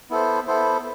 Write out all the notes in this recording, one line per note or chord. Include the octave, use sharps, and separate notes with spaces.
B3 E4 A4 C5
B3 E4 A4 C5